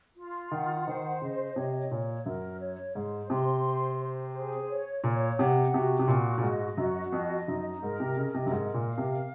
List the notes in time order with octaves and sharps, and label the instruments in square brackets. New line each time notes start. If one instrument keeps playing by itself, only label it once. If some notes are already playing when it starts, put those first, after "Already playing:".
[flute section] F4
[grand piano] D#3 [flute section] F#5
[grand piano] D#3 [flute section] C5
[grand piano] C#3 [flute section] D#5
[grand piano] C3 [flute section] C#5
[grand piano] A#2 [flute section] C#5
[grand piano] F#2 [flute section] A#4
[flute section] C#5
[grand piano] G#2 [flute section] C5
[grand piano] C3 [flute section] C6
[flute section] C5
C5
G#4
C#5
[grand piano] A#2 [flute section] C#5
[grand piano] C3 [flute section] F#5
[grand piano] C3 [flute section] F#4
[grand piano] C3
[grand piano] A#2 [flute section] F#4
[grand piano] A#2
[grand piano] G#2 [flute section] D#5
[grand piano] F#2 [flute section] F#4
[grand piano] F2 [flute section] D#5
[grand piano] F#2 [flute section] D#4
[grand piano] G#2 [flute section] A#4
[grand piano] C3
[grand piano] C#3 [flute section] D#5
[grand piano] C3
F#2
[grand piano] G#2 [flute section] A#4
[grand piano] A#2
[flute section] F5
[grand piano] C3